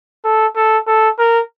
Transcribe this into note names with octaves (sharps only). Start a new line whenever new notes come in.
A4
A4
A4
A#4